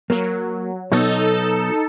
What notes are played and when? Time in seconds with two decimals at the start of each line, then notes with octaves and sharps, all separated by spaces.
0.10 F#3 A#3 A#4
0.92 B2 F#3 B3 D#4 A4